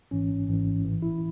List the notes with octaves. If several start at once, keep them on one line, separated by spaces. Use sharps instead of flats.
G#1 G#2 E3 C#4
G#1 G#2 E3
A1 A2 E3
E4